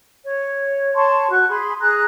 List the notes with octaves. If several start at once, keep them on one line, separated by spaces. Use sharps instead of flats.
C#5
C#5 A5 C6 C#6
F#4 C#6 F#6
G#4 B5 C6
G#4 A#5 F#6